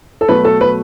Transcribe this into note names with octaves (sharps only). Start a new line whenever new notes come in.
A4
B2 F#3 A3 B4
A4
B4